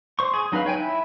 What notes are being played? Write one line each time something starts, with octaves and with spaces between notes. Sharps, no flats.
C5 C#6
G#4
F#3 D#4 B4 F5
C#5 G5 G#5
E4